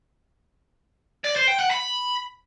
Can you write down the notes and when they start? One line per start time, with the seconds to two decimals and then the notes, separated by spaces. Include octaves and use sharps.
1.25 D5
1.36 C5
1.48 G5
1.59 F#5
1.70 B5